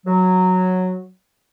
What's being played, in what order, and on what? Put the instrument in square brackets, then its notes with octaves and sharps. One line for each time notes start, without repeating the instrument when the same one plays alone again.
[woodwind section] F#3